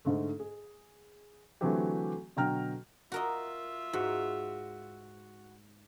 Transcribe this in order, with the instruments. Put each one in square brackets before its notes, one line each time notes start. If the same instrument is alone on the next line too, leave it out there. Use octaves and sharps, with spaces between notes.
[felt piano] G#2 D3 A3
G#4
D3 E3 F#3 A3 C4 G4
B2 D3 F#3 G5 A#5 F6
[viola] F4 E5 [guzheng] F#4 A#4 D#5
[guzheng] G#2 [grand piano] F#4